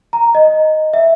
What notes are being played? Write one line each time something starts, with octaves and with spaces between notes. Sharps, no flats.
A#5
D#5
E5